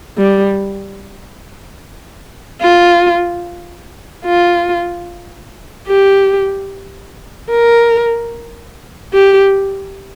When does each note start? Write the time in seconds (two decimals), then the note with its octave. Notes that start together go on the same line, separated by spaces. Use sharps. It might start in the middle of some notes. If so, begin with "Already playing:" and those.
0.18 G3
2.61 F4
4.25 F4
5.88 G4
7.51 A#4
9.13 G4